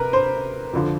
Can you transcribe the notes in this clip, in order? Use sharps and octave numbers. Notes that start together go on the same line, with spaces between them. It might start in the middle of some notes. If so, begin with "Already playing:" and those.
Already playing: C3 A#4 B4
C5
F2 D3 F3